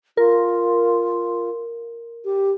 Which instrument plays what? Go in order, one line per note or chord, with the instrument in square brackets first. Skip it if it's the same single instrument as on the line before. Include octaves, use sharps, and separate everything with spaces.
[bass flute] F4 [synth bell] A#4
[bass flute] G4